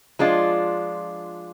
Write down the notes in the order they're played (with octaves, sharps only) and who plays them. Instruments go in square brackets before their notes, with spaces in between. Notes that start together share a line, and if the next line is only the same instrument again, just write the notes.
[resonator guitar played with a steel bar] F3 G#3 D4 F4